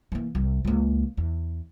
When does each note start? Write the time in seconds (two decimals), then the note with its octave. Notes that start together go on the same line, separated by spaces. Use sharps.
0.12 E3 A#3
0.35 C2
0.65 C#2 A#3
1.17 E2